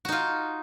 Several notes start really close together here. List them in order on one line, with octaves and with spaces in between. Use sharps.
F#4 D#4 F4